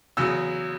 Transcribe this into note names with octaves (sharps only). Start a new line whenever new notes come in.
E2 C#3 F#3 E6